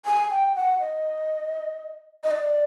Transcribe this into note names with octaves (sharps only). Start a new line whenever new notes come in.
G#5
G5
F#5
D#5
D#5
D5